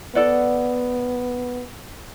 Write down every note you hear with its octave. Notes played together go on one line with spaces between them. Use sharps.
B3 A4 D5 F#5